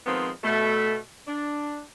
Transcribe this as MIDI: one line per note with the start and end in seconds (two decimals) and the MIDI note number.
0.06 0.30 51
0.06 0.30 53
0.06 0.30 56
0.06 0.30 59
0.06 0.30 60
0.44 0.96 47
0.44 0.96 57
1.27 1.81 62